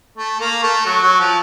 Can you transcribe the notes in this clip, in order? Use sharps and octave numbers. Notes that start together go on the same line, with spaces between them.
A3
A#3
A3
F#3
F#3
F3